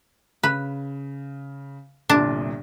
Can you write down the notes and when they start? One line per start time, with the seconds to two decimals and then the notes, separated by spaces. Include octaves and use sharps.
0.43 C#3 B4
2.10 G1 C2 A#2 D4